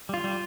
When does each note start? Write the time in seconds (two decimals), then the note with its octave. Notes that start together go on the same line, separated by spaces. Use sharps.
0.09 G3 F4
0.24 G3